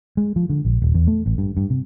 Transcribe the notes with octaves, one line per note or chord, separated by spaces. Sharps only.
G#3
F3
D3
A#1
D#1
E2
A3
A1
G2
G2
C3